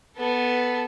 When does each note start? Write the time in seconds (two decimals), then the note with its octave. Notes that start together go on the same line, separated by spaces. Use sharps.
0.16 B3 A4